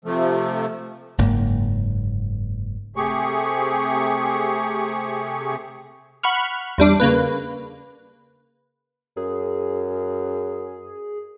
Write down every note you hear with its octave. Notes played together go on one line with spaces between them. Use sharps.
C3 F3 A3
F#1 G#2 A#3
C3 A3 G4 G#4 C#6
F#5 B5 C#6 F6
E2 G3 D4 D6
C#3 A#3 B4
F#2 G#4